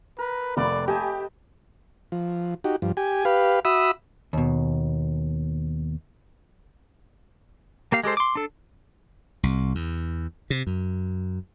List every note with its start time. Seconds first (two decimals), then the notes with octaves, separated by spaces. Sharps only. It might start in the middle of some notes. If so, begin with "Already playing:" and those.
0.19 A#4 B4
0.57 F1 A3 A#3 B4 D5
0.88 G4 D#5 G#5 A5
2.12 F3
2.64 D#4 F#4 G4
2.82 G2 F3
2.97 G4 G#5
3.25 G4 B4 F5
3.65 F#4 E5 B5 D#6 E6
4.33 D#2 B2
7.92 A#3 G4 F5
8.04 G#3 G4 A4 C5
8.17 C6 D6
8.35 D4 A4
9.43 C2
9.75 E2
10.50 C3
10.67 F#2